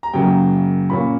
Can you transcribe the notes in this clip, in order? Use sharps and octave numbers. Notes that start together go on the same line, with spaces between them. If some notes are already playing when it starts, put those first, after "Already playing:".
A#5
F#2 C#3 F#3 A#3 G5
A#2 A#3 C#4 B5